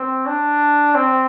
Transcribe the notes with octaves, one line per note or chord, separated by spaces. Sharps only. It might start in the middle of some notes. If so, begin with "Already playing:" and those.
Already playing: C4
D4
C4